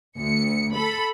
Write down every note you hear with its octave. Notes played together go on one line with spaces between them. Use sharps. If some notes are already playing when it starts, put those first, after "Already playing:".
D2 C#7
A4 B5